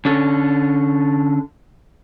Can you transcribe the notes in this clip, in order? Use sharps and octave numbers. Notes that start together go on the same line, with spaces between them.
D3 C#4 A4